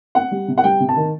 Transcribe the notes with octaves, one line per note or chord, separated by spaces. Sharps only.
C4 F#5
G3
C3
F#5
G3 G5
C3
A5
D#3